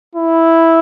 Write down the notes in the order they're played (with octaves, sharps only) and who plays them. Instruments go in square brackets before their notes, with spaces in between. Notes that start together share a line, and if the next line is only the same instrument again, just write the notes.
[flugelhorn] E4